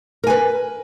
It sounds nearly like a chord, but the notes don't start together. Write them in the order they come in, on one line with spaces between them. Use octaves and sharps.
A#4 G#5 B4